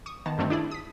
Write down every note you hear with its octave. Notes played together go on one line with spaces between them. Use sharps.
C#6 D#6
D#3 B3 A5
G2 D3 D#3 A3 C4
D4 E4 G#4 D5
D#6 B6